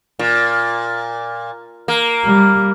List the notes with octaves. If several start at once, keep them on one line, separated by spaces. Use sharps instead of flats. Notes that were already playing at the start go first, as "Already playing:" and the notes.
A#2
A#3
G3